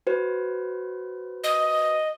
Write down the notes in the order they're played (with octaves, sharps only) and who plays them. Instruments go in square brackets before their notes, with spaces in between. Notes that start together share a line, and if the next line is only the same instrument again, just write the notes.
[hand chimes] F#4 B4 C5
[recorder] D#5